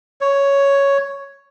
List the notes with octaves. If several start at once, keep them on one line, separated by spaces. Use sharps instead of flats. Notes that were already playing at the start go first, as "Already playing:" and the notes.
C#5